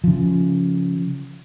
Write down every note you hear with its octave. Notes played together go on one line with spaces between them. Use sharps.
C#3 F3